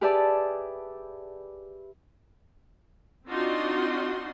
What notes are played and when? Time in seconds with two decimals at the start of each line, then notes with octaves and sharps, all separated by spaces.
0.01 G4 G#4 B4 D5 E5 A5
3.27 C4 D4 D#4 F4 F#4 C6